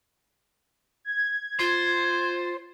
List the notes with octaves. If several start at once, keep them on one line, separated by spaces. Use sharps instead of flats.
G#6
F4 C5